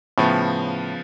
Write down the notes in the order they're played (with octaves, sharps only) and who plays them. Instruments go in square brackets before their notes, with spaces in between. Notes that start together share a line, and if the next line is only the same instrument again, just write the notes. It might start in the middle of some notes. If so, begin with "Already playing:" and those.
[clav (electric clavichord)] A2 [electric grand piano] C#3 F3 B3